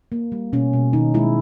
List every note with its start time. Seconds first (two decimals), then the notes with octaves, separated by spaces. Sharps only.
0.12 A#3
0.32 G3
0.53 B2 C#4
0.73 B2
0.93 D#3 D#4
1.14 G#3 E4